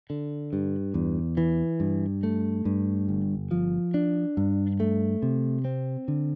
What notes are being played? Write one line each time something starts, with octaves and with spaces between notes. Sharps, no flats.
D3
G2
E2
E3
G2
A3
G2
G1
F3
D4
G2
A3
C3
C4
D3